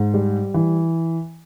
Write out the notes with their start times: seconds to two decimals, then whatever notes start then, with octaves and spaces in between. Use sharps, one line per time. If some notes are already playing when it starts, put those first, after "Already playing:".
Already playing: G#2
0.14 G3
0.54 E3